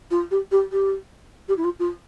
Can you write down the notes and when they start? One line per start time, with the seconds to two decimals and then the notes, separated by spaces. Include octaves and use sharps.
0.11 F4
0.31 G4
0.51 G4
0.72 G4
1.48 G4
1.57 E4
1.64 F4
1.79 F4